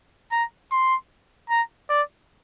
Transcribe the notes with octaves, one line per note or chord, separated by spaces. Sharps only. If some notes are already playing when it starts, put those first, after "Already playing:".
A#5
C6
A#5
D5